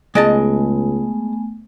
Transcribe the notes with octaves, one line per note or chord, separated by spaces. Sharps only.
C#2 G#3 A3 B3 D#5 G#5 A5